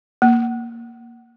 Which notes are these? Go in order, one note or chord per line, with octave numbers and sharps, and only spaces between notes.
A#3